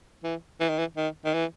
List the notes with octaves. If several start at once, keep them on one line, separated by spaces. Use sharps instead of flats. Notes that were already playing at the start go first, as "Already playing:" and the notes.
E3
E3
D#3
E3
D#3
D#3
E3